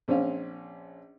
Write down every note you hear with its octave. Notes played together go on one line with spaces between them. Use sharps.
A#1 C4 C#4 F5